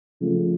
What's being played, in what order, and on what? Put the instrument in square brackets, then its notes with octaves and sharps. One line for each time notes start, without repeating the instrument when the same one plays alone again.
[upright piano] C#3 F3 A3